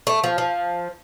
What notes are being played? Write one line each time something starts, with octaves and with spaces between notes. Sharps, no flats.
A3
F3
F3